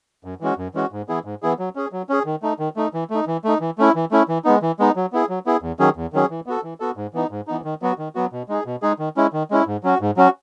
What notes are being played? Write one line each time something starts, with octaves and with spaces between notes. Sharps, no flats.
F#2
E3 G#3 C#4 F#4
F#2
E3 G#3 C#4 F#4
G#2
E3 B3 E4 G#4
G#2
E3 B3 E4 G#4
F#3
C#4 G#4
F#3
C#4 G#4
D#3
A3 D#4
D#3
A3 D#4
E3
A3 D#4
E3
A3 D#4
E3
A3 C#4 E4
E3
A3 C#4 E4
E3
G#3 B3 D#4
E3
G#3 B3 D#4
F#3
B3 E4 G#4
F#3
B3 E4 G#4
E2
D#3 F#3 C#4 G#4
E2
D#3 F#3 C#4 G#4
E3
B3 F#4 A4
E3
B3 F#4 A4
G#2
E3 B3 D#4
G#2
E3 B3 D#4
D#3
F#3 B3 F#4
D#3
F#3 B3 F#4
B2
G#3 D#4 G#4
B2
G#3 D#4 G#4
D#3
G#3 C#4 E4
D#3
G#3 C#4 E4
G#2
F#3 C#4 F#4
G#2
F#3 C#4 F#4